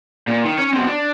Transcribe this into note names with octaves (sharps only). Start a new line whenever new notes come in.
A#2
D#3
C#4 C#5
B2 C4
D4